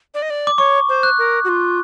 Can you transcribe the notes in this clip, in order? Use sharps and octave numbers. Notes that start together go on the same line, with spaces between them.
D5
D#5
D5
D6
C#5 C#6
C5
F#6
A#4
F#4
F4